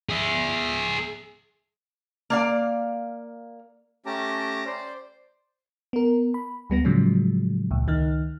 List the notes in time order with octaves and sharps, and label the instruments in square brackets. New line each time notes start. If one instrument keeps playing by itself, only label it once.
[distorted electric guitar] G#4 E5
[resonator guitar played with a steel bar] A#3 D5 F5
[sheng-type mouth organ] A3 C#4 G4 A5 A#5 D6
C5 D5
[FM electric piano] B3 A#4
B5
D2 G3 B3 A#6
A2 C#3 F3 F#3 G#3
C#2 A#2
C#2 D#3 D#4 F6